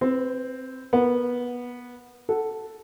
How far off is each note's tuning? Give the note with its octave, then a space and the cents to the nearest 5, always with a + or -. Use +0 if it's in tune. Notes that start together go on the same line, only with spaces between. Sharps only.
C4 +0 B4 +25
B3 -15 A#4 +0
A4 +0 F#5 +0